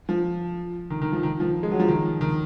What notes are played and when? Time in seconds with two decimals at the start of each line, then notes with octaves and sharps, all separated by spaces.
0.09 F3
0.90 D#3
1.02 D#3
1.12 F3
1.23 D#3
1.40 F3
1.63 G#3
1.71 F#3
1.79 F3
1.88 D#3
2.21 D#3